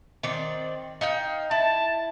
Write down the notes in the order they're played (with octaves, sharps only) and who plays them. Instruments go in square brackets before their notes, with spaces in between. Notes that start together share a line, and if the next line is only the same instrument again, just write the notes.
[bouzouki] D#3 C4 D5
D#4 F5 G5
[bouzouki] E4 [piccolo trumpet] A5